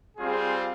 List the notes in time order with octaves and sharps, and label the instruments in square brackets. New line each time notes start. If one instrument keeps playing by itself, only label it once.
[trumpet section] G3 C4 F4 G#4